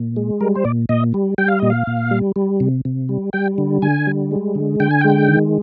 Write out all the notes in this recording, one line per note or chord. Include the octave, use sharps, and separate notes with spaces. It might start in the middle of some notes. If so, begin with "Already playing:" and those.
Already playing: A#2
G#3
G3 A#4
C5
A#2 D5
A#2 D#5
G3
G3 G5
F5
A#2 D#5
F5
A#2
G3
G3
C3
C3
G3
G3 G5
D3
D3 G#5
G3
G#3
D3
D3 G5
G#5
G#3 G5
D#3